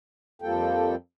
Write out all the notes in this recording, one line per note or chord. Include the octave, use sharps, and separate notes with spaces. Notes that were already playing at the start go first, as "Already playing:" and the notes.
F2 F3 G3 A#3 A4 G5